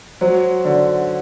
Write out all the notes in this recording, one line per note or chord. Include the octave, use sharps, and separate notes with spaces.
F#3 C5
D3